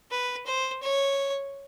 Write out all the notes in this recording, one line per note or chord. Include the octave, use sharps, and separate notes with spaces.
B4
C5
C#5